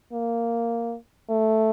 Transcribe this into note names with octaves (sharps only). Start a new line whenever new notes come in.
A#3
A3